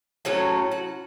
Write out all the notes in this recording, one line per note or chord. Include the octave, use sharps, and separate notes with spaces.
A2 F#3 C#4 C#5
F#4